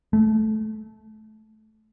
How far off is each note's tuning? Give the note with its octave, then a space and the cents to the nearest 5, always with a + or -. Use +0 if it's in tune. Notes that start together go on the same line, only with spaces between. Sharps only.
A3 -20